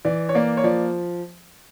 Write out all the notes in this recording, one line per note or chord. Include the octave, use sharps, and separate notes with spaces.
E3 D5
C#5
A#3 D5
C#5
F3 D5